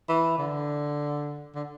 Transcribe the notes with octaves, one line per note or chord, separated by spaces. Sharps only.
E3
D3
D3